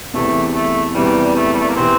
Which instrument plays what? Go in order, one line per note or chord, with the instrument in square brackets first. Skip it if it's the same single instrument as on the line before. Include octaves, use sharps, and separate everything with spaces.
[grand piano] E2 C3 E3 [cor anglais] A3
[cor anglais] A3
[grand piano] E2 C3 E3 [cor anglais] G3
[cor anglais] G3
A3
G3
A3
A#3
[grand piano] C3 E3 [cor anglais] C4